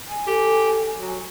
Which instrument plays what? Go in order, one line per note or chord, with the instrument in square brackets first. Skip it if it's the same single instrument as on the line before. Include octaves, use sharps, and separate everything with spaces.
[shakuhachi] G#5
[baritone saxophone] G4 [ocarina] A4
[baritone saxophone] F#3